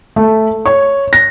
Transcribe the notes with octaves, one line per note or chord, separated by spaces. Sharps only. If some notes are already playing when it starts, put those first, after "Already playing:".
A3
C#5
A#6